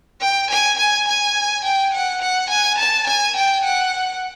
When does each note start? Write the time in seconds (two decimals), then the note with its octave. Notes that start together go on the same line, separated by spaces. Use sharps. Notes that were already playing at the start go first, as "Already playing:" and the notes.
0.20 G5
0.49 G#5
0.78 G#5
1.06 G#5
1.63 G5
1.92 F#5
2.21 F#5
2.49 G#5
2.77 A5
3.06 G#5
3.35 G5
3.63 F#5